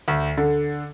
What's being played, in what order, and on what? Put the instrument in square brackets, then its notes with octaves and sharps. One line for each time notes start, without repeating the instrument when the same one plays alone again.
[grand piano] D2
D3